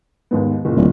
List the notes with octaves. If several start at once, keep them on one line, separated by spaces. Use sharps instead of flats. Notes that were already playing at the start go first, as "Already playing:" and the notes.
D#2 G#2 B3
F#1 A#2
D1